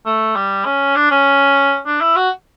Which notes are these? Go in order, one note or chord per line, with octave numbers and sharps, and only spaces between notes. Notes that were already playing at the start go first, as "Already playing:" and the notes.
A3
G3
C#4
D4
C#4
D4
E4
F#4